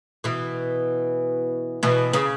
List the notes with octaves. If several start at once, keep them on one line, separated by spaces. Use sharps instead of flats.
B2 E3
B2 E3
C#3